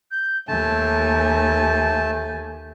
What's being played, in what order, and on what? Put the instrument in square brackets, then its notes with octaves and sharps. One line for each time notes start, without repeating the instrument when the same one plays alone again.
[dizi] G6
[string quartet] D#2 G#5 [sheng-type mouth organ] A3 A5 [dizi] G6